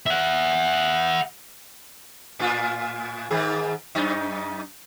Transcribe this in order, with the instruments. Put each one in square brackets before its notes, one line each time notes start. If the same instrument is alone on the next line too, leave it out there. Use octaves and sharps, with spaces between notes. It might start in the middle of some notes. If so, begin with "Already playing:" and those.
[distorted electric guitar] E5 F#5
[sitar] A2 F4
G#2 D#3 G#4
F#2 D#4